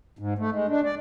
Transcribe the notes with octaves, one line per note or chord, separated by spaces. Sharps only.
G#2
A3
G#3
D4
D5